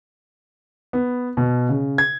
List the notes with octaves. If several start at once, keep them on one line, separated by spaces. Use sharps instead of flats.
B3
B2
C#3
G#6